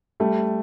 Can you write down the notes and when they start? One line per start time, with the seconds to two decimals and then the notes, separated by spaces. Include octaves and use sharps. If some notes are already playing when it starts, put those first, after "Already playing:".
0.20 G3 A3